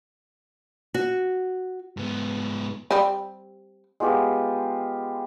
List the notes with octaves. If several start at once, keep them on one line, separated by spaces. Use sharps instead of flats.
F#4
G#2 B3
G3 C4
G#3 B3 F4 G4